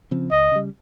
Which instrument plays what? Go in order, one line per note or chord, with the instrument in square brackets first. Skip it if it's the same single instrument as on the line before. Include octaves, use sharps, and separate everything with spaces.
[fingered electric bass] C#3 F3 C4
[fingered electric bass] C#2 [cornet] D#5
[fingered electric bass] C#3 G3